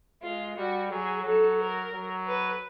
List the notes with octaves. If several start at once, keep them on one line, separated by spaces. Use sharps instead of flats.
G#3 F4
G3 F#4
F#3 G#4
F#3 A4
A#4
F#3
B4